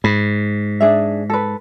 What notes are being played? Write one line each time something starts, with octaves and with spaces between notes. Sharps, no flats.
G#2 B5
D4 G#4 E5
A4 B4